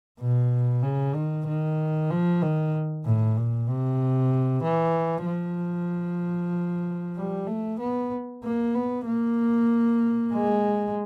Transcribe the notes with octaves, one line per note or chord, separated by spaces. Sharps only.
B2
C#3
D#3
D#3
F3
D#3
A2
A#2
C3
E3
F3
G3
A3
B3
A#3
B3
A#3
G#3